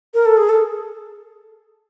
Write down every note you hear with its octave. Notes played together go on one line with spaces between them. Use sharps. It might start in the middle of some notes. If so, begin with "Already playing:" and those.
A#4
A4
G#4
A4